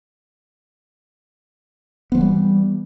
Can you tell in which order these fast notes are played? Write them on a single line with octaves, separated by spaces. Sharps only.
B3 F3 E3 G3